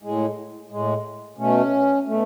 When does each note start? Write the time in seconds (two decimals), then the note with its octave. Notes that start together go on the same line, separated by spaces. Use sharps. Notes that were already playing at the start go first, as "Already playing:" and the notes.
0.02 A2 G#3
0.70 A2 G#3
1.38 B2 A3 C#4
2.07 B2 A3